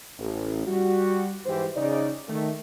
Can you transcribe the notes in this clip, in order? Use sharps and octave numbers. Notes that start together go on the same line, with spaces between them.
A1
G3 F#4
G#2 E3 G4 C5
C#3 D#4 D5
D#3 A3